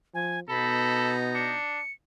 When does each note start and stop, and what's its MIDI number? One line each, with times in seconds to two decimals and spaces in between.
0.14 0.41 53
0.14 0.40 80
0.49 1.57 47
0.49 1.56 59
0.49 1.56 63
0.49 1.13 69
0.49 1.56 82
0.49 1.17 83
1.35 1.80 62
1.35 1.92 97